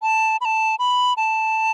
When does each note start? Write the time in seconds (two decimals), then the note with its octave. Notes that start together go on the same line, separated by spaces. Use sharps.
0.02 A5
0.41 B5
0.45 A5
0.79 B5
1.17 A5